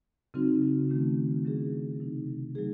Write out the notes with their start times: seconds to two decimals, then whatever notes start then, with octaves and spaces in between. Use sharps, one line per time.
0.34 C#3 F#3 C4 D#4 F#4
0.89 D#3 A3 C#4
1.45 D#3 F#3 C#4 E4 G#4
2.00 C3 F#3 C4 D#4
2.55 F#3 A3 D#4 G#4